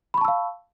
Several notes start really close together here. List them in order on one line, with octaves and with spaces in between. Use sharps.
B5 C#6 A5 E6 F5